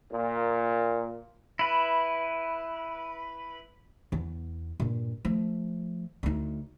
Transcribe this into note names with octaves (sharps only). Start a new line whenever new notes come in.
A#2
E4 B4
E2 B3
G2 A#2
F3 A3
D2 D#4